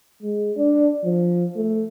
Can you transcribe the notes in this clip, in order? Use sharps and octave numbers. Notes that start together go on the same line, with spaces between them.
G#3
D4
F3
A3